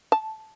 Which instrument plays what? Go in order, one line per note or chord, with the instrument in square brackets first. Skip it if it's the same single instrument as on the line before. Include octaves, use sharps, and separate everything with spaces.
[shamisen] A5